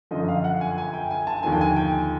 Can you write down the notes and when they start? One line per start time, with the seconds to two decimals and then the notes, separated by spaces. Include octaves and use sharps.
0.11 F#2 D3 F3 D#5
0.28 F5
0.44 F#5
0.61 G#5
0.78 G#5
0.94 G5
1.11 G#5
1.27 A5
1.43 D#2 D3 F3 G#5
1.52 G5
1.61 G#5
1.76 G5